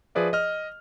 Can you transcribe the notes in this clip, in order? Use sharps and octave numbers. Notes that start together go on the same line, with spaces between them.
F3 G#4 B4 D5 E5
D#5 F6